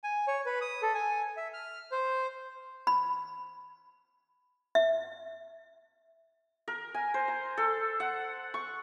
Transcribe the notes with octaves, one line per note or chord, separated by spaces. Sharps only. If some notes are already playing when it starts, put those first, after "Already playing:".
G#5
C#5
B4
D#6
A4
G#5
E5
F6
C5
B5
E5
A#4
G#5
C5
A#5
A4
F#5
C#6